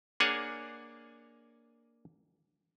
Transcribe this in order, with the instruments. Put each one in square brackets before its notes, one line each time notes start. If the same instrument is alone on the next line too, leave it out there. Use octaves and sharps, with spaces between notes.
[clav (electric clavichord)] A#3 D4 G#4 C#5 F#5 G#5